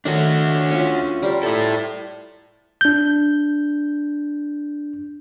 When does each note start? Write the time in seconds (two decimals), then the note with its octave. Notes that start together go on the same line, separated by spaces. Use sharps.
0.05 D#3 F#3 A3 D4 F#4
0.55 C#5
0.71 C#4 F4 E5
1.22 G3 A#4 C5
1.43 E4 A4 C5
2.81 D4 G6